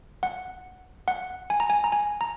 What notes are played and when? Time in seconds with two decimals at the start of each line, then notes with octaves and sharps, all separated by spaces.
0.23 F#5
1.08 F#5
1.50 G#5
1.60 A#5
1.70 G#5
1.84 A#5
1.92 G#5
2.21 A#5